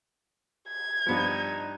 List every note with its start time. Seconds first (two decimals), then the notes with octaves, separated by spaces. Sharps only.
0.69 G#6
1.07 G2 F3 B3 D#4